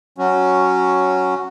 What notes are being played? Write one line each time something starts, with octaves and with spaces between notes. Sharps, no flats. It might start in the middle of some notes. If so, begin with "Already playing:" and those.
F#3 C#4 F#4